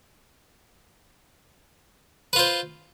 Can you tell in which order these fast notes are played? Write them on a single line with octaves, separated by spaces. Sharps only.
B4 F4 C5